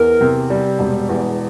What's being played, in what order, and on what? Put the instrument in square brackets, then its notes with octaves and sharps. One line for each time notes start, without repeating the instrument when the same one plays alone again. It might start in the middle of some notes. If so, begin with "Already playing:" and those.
Already playing: [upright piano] E2 [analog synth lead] A#4
[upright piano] C3
G3
E1
E2